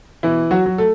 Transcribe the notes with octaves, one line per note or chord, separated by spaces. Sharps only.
B2 E3 E4
F#3 F#4
F#3
A3 A4